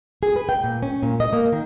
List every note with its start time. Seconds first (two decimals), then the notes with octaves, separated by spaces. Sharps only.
0.23 G#4
0.36 B4
0.49 G5
0.64 A#2
0.83 C#4
1.03 A#2
1.20 D#5
1.33 A#3
1.52 D#3